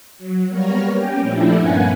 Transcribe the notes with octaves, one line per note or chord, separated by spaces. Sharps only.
F#3
G3 A#3 B3 A#4 C#5 A#5
C#4 G4 G5
A#2 F3 A3 D4 E4
G2 A#3 B3 C#4 F#5 G#5